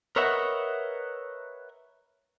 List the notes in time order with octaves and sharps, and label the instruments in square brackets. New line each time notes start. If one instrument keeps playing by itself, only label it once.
[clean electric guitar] A#4 B4 C#5 D#5 E5 F#5